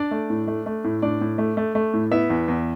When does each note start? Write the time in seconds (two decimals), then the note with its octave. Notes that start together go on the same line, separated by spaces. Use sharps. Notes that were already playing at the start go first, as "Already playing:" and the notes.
Already playing: D4 D5
0.11 A3
0.30 A2
0.47 A3
0.66 A3
0.84 A2
1.02 A2 D4 D5
1.21 A2
1.38 A3
1.57 A3
1.75 A3
1.93 A2
2.11 B3 E4 E5
2.30 E2
2.48 E2